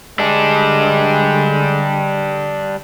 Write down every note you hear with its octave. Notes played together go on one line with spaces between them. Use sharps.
D3 G3 G#3 D4